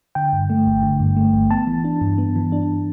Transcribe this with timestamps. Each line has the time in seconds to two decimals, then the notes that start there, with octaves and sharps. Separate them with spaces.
0.15 D3 G5
0.33 G2
0.50 A3
0.67 G1
0.83 D3
1.00 G2
1.17 A3
1.34 G1
1.51 B3 A5
1.67 E3
1.84 D4
2.01 G2
2.18 B3
2.36 E3
2.52 D4